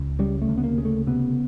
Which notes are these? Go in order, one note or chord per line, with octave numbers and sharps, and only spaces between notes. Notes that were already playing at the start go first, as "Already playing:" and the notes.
Already playing: C#2
C#3 G3
A3
D2
B3
A#3
C#3
A3
C3 B3